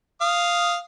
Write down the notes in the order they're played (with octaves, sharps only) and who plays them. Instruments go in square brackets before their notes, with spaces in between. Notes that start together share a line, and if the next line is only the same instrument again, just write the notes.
[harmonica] F5 D#6